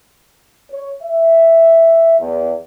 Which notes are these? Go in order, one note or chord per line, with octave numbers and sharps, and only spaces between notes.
C#5
E5
E2